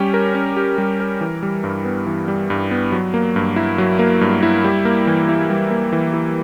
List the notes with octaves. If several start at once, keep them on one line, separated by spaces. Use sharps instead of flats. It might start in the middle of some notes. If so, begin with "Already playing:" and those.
Already playing: G3 C#4 G4
A#4
C#4
G4
G3
A#4
E3
G3
G2
B3
E3
G3
G2
B3
F#3
A#3
G2
E4
F#3
A#3
G2
E4
G3
A#3
E3
E4
G3
A#3
E3
E4